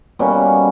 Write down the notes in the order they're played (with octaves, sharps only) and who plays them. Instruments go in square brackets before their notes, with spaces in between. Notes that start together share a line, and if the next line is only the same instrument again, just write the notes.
[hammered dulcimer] B2 G3 A#3 C#4